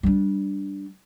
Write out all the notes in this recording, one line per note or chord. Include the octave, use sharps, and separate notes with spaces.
G3 D4